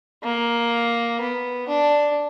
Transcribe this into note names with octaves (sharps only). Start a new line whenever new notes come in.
A#3
B3
D4